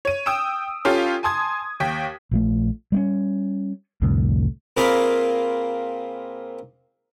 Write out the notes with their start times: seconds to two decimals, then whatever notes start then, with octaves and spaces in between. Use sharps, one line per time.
0.05 C#5 D#7
0.26 G5 D#6 E6 D7 E7
0.85 C#4 F4 G4 A4 F5
1.23 G#5 A5 C6 D#6 G#6
1.80 D#2 G5 B6
2.31 A#1 F3 A3
2.92 G3 C4 C#4
4.02 C2 F2 A2 D3
4.77 A#2 A#3 C4 G#4 F5 B5